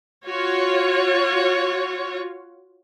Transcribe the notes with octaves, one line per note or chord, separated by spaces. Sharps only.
F4 F#4 C#5